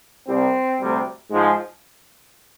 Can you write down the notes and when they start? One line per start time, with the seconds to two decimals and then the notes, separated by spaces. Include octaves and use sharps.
0.26 C2 C3 G3 C4
0.79 D2 C3 G3
1.31 G#2 F3 G#3